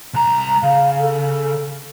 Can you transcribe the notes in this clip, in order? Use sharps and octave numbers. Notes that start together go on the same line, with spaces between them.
C2 A#5
C#3 F5
A4